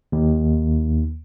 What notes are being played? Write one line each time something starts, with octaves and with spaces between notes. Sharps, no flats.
D#2